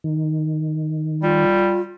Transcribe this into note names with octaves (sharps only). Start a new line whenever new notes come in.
D#3
G3 F4